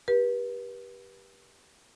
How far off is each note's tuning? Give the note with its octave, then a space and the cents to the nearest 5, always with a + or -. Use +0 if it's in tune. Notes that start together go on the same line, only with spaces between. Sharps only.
G4 +0 B4 -35